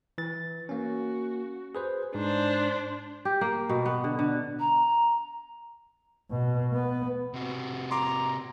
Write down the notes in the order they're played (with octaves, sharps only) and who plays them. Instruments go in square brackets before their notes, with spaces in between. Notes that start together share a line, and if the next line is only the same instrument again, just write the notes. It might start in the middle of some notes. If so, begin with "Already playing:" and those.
[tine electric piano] E3 A6
[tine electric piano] A#3 C#4 [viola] F#4
[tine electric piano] G#4 B4 C5
[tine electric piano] G#2 [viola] D4 C5
[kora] G4
A#3
B2
B3
D3
D3
[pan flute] A#5
[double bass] B2
B3
[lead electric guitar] C3 F#4
[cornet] A#5 [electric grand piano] C6 D6